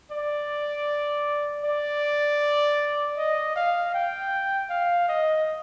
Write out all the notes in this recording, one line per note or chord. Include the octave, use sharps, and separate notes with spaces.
D5
D5
D#5
F5
G5
F5
D#5